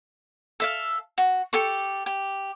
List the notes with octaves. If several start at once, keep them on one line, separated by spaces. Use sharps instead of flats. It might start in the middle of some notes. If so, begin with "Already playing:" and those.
A4 E5 F5
F#4
G4 A4 C#6
G4